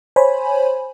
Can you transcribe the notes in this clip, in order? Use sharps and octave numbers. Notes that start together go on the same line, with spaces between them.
C5 C#5 G#5 B5